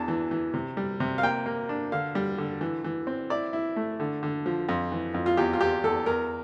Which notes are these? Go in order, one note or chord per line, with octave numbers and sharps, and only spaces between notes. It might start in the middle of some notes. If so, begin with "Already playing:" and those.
Already playing: E2 D4 A5
E3
E3
C3
G3
C3
F5
A#3 G5
A#3
D4
D3 F5
G3
D3
E3
E3
C4
E4 D5
E4
A3
D3
D3
F3
F2
E3
F2
F4
E2 G4
F4
E2 G4
E2 A4
E2 A#4